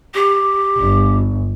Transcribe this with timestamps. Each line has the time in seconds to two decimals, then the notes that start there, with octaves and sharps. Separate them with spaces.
0.14 G4
0.79 G1